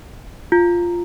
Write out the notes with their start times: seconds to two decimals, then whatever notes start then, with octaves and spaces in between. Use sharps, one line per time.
0.52 F4